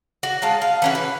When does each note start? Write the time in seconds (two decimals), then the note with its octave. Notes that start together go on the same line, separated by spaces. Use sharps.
0.23 F#4
0.42 G#3 C#4 F4 A5
0.62 F5
0.82 E3 C#4 F#4
0.95 B4